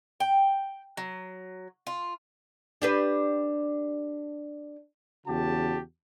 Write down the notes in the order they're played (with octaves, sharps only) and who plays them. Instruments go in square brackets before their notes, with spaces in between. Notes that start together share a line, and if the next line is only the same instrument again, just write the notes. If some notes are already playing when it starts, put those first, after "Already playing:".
[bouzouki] G5
F#3
F4
[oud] D4 G4 B4
[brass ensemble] E2 C#3 F#4 G4 A5